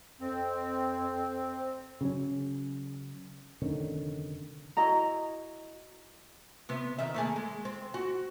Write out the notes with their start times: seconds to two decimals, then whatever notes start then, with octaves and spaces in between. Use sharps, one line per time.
0.21 F2 C4
2.01 C#3 F#3 C#4
3.62 F1 D3 D#3 C#4
4.77 E4 F#4 D#5 A#5
6.69 C3 B3
6.99 D#3 E5
7.14 A3 A#3 G#4
7.36 G#3
7.65 C4
7.94 F#4